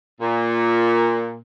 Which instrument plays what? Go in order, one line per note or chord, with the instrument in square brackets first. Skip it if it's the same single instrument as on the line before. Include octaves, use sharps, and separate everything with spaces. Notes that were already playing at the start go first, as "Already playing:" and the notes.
[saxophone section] A#2